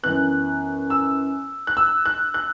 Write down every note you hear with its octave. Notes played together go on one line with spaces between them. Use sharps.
F#2 E3 B3 F#6
E6
F#6
E6
F#6
F#6